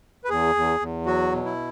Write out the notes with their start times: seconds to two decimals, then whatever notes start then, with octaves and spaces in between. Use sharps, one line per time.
0.24 B4
0.29 E2 G#4
0.55 E2
0.80 E2
1.06 F#3 F#4
1.33 B2
1.45 E4